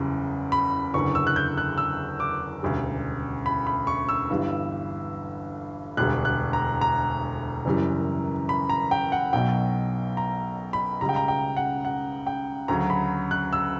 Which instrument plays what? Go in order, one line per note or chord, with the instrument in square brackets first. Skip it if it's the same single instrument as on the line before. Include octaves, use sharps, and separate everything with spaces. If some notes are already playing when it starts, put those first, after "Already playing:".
Already playing: [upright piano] F#1 E2 C#3 G3
B5
F#1 E2 D3 C#6
E6
F#6
G6
F#6
E6
D6
E1 D2 C#3 G3
B5
B5
C#6
E6
G1 G2 E3 G3
E1 D2 D3 G3 F#6
F#6
A#5
A#5
F#1 F#2 E3 G3
B5
A#5
G5
F#5
B1 B2 F#3 G5
A#5
B5
C#2 C#3 G3 A#5
G5
A#5
G5
F#5
F#5
G5
D2 C#3 F#3 A#5
B5
F#6
E6